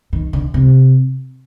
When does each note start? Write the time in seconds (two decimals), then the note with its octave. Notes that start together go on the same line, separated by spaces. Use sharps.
0.13 D#3
0.33 D3
0.54 C3